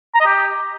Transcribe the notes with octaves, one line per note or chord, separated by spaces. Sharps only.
A#5
D#5
G4